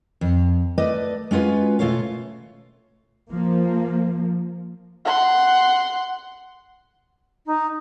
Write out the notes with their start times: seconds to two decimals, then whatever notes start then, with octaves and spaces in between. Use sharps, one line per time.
0.21 F2
0.78 A3 B4 D5 D#5
1.31 G#3 C#4 F4 F#4 B4
1.79 B2 A3 F4 C#5 F5
3.30 F3 A#3
5.05 F#5 C6
7.46 D#4